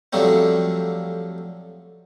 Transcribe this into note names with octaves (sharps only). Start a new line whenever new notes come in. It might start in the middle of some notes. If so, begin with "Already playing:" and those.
F2 D3 F#3 G3 A3 C4